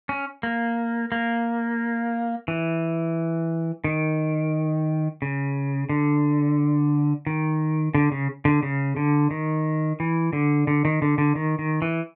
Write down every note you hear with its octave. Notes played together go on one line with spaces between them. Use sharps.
C#4
A#3
A#3
E3
D#3
C#3
D3
D#3
D3
C#3
D3
C#3
D3
D#3
E3
D3
D3
D#3
D3
D3
D#3
D#3
E3